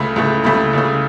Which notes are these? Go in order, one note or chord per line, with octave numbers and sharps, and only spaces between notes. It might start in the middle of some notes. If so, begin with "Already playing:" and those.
Already playing: C#2 C#3 A3 B5
C#2 C#3 A3
C#2 C#3 A3 B5
C#2 C#3 A3